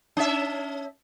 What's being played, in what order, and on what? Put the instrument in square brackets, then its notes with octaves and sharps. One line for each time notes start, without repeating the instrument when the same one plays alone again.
[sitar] C#4 E5